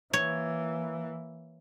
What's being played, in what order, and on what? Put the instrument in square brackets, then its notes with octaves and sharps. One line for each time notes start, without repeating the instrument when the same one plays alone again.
[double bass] E3 A#3 [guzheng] C#5